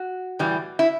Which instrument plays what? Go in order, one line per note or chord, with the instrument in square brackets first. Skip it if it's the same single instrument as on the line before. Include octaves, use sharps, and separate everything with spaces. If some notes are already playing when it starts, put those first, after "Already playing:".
Already playing: [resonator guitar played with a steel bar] F#4
A2 E3 G3
E4